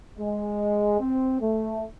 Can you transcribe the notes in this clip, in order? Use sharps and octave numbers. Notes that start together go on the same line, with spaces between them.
G#3
C4
A3